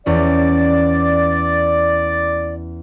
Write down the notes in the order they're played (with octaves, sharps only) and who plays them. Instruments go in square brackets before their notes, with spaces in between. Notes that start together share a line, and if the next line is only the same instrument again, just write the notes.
[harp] E2 C#4 [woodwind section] D5